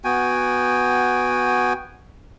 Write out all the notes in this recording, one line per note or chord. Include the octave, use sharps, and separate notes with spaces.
B3 F#4 G5 G#5